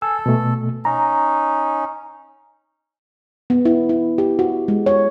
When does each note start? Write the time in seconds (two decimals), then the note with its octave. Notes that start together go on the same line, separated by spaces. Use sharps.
0.02 A4 G#5 E6
0.26 B2 A3
0.85 C#4 D#4 A#5
3.50 B3
3.65 E4
3.89 E4
4.18 G4
4.39 F#4
4.68 G#3
4.86 C#5